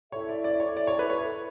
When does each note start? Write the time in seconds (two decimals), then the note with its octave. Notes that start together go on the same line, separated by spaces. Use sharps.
0.12 E4 A4 C#5 E5
0.29 D5
0.44 D5
0.60 C#5
0.77 E4 A4 D5 E5
0.87 C#5
0.99 B4
1.10 C#5